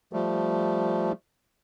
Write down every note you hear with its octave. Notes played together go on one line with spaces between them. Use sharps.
F3 G3 A3